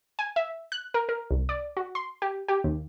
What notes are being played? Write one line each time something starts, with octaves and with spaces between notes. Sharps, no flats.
G#5
E5
F#6
A#4
A#4
C2
D5
F#4
C6
G4
G4
D#2